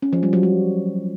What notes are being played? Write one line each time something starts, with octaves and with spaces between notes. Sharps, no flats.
C#4
F3
G3
F#3
G3